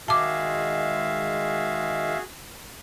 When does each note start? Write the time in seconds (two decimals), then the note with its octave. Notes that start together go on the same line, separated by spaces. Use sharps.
0.08 D#3 G#3 F#4 G#4 E5 F5 A5 D6